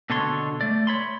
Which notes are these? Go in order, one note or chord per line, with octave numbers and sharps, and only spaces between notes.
B2 D3 D4 A4 C#5 C6
A3 D5
C#5 B5 C6